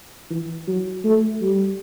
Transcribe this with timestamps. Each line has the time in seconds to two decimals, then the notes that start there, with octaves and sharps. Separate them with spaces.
0.31 E3
0.68 F#3
1.04 A3
1.41 G3